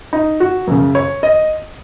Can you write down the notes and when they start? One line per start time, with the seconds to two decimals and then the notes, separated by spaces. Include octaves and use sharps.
0.13 D#4
0.40 F#4
0.67 F#2 C#3
0.95 C#5
1.23 D#5